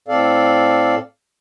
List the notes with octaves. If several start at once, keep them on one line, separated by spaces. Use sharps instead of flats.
A2 C4 A4 D5 F5